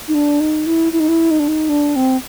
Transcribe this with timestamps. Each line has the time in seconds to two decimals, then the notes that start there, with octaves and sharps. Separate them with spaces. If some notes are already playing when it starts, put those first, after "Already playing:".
0.08 D#4
0.14 D4
0.40 D#4
0.66 E4
0.93 E4
1.00 D#4
1.08 E4
1.31 D#4
1.40 D4
1.48 D#4
1.69 D4
1.96 C4